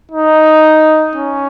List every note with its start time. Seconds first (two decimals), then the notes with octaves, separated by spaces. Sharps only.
0.11 D#4
1.15 C#4